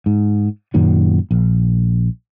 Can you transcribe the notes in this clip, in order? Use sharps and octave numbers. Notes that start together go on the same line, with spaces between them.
G#2
F#2 A#2 D#3 F#3
A#1